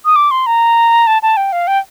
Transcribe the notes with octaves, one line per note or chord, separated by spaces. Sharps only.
D#6
D6
C6
A#5
A5
A5
G5
F5
G5